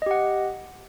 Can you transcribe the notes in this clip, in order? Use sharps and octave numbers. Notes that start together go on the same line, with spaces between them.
G4 D#5 F#5